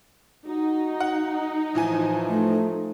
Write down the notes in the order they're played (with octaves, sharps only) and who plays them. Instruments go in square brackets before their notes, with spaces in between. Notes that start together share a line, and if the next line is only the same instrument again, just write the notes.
[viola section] D#4 [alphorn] F#4
[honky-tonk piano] F#5
[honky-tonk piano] A2 E3 G#5 [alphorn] F3
[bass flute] A3